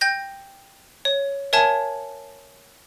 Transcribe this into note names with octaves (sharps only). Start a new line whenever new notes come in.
G5 G6 A#6
C#5
A#4 C#5 E5 G#5 A5 G#6